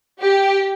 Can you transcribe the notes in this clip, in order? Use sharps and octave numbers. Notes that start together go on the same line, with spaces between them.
G4